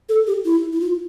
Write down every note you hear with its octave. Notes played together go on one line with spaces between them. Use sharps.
A4
G4
E4
E4
F4